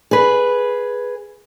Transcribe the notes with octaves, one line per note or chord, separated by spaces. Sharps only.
G#4 B4